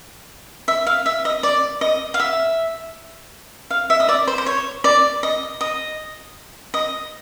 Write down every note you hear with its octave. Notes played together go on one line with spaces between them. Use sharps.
E5
F5
E5
D#5
D5
D#5
F5
E5
F5
E5
D#5
D5
C5
C5
C#5
D5
D#5
D#5
D#5